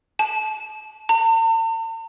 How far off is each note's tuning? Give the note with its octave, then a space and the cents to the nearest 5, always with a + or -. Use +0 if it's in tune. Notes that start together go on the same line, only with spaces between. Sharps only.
A5 -25
A5 +45